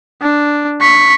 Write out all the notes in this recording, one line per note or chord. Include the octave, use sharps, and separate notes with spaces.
D4
C#6 B6